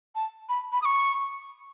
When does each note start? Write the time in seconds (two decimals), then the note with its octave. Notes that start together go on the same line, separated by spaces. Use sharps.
0.15 A5
0.49 B5
0.72 B5
0.82 D#6
0.85 C#6